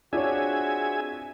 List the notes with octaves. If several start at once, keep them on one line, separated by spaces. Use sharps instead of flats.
C4 D4 F4 F#4 G#4 C#5 E5 G#5